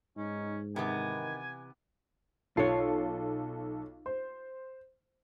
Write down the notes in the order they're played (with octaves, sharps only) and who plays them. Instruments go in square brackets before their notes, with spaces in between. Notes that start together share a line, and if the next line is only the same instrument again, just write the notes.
[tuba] G#2 [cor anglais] C#4 [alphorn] D#4
[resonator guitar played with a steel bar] C3 E3 B3 [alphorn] D#3 [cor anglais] G#5
[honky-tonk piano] B1 A4 C7 [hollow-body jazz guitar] F4 C#5
[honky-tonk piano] C5